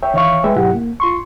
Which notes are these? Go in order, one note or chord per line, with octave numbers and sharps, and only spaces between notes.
C#5 E5 G5
D#3 E3 C#5 E5 F5 C#6
G#3 B4 E5 G5
G#2 B2 F#3 E4 G4 F#5
A#3
F4 C6 C#6